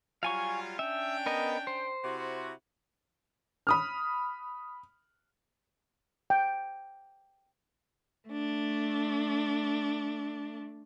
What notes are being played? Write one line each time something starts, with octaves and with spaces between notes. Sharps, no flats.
F#3 G3 F4 F5 G#5 C#6
C#4 D4 E5 G5
B3 A#4 D#5
C5
C3 E4 F#4
B5 D#6 F6
G5
A3 D4